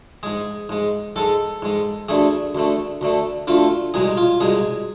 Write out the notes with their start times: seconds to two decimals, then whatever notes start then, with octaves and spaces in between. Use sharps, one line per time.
0.23 G#2 G#3 G#4
0.69 G#2 G#3
1.16 G#2 G#3 A4
1.62 G#2 G#3
2.09 D2 D3 A3 G#4
2.55 D2 D3 A3
3.01 D2 D3 A3
3.47 D2 D3 A3 F4
3.94 C2 B2 G#3 G#4
4.17 F4
4.40 C2 B2 G#3 G#4